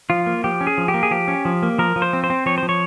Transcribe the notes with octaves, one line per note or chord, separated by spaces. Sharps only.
F3 F4
A#3
F3 G4
C#4
G#4
F3
G4
A#3
G#4
F3 G4
C#4
F3
A#3
F3 A#4
F3
C5
C4
C5
C4
F3 C#5
F3 C5
C#5